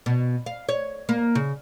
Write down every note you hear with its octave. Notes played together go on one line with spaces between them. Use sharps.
B2
F5
C#5
A#3
C#3